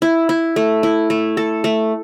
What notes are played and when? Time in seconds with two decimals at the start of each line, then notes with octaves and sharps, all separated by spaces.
0.02 E4
0.29 E4
0.56 A3
0.83 E4
1.10 A3
1.37 A4
1.64 A3